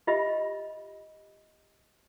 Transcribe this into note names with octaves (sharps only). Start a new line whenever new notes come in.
F4 G4 D#5 E5 B5